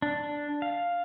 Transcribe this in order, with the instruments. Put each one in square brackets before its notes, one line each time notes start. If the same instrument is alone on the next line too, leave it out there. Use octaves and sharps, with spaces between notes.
[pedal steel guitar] D4
F5